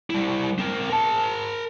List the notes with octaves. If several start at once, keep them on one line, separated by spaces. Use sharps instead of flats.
G3 E4
C4 A#4
A#4 A5